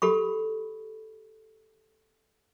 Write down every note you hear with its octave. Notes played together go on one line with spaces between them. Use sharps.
G4 A4 B5 C#6